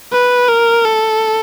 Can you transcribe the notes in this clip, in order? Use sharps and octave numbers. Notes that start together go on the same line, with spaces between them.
B4
A#4
A4